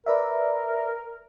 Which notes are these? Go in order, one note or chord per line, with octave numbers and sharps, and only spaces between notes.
A#4 B4 D5 E5